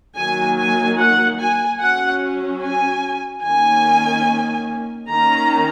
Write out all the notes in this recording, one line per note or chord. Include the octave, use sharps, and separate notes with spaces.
D#3 F#3 A#3 G#5
G#5
F#5
G#5
F#3 C#4 F#5
G#5
D#3 A#3 C#4 G#5
D#3 A#3 C#4 A#5